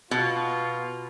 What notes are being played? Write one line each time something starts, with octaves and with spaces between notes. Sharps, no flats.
B2 B3 F4